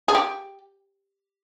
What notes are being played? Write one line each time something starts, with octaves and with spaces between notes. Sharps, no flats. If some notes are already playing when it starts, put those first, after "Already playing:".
G#4
G4